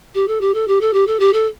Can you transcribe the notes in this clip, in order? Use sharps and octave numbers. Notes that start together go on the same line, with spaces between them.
G4
A4
G4
A4
G4
A4
G4
A4
G4
A4